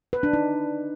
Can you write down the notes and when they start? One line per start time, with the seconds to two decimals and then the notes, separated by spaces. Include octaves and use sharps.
0.13 B4
0.23 D4
0.33 D#4